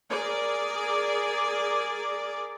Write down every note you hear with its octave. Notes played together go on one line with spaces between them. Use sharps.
G#4 A#4 D5